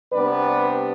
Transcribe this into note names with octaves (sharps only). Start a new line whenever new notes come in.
C3 G3 B3 D4 B4 D5